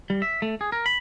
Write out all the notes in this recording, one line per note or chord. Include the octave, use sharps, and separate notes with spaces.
G3
E5
A3
G#4
A#4
B5